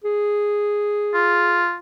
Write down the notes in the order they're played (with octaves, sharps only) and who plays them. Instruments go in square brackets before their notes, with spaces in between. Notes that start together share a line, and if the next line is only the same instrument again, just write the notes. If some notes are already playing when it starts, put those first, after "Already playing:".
[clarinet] G#4
[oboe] F4